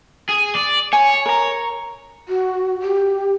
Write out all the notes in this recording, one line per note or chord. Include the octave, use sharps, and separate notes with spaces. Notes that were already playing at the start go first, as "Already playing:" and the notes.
G#4
D5
C#5 G#5
A#4 A#5
F#4
G4